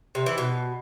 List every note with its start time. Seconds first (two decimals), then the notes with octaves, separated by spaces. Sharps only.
0.15 C3
0.26 E3
0.38 B2